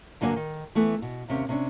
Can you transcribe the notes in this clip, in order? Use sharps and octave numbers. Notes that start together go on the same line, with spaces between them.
G2 D3 F#3 A#3 G5 G#5
D#3
E3 A3 B3
B2
D#2 C3 C#4
C3 C#4 D4